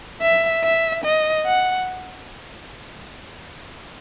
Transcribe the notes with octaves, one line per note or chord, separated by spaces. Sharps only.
E5
E5
D#5
F#5